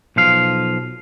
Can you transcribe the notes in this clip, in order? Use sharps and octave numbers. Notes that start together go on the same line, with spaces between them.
B1 F3 F5